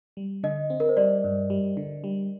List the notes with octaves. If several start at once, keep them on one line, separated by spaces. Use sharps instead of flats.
G3
D3 D#5
C4
A#4
C5
G3 D5
G2
G3
D3
G3